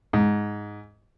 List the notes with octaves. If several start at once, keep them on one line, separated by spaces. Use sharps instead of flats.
G#2